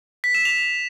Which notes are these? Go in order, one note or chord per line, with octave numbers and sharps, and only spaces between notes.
B6
E7
F7